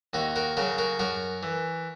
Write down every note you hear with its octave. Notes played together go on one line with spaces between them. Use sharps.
D#2 D#4 F#4
F#4 A#4
C#3 F#3 F#4 A#4
F#4 A#4
F#2 F#4 A#4
E3